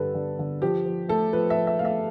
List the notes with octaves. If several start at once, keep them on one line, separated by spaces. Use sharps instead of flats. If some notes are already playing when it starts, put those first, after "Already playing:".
Already playing: G2 D3 G3 A4 B4
D3
D3
F3 G4
F3
A3 A4
F3 B4
E5
F3
E5
A3 F5
E5